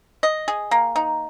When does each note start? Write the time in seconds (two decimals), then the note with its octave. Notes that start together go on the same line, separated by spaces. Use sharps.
0.23 D#5
0.48 G#4
0.71 A#3
0.96 D#4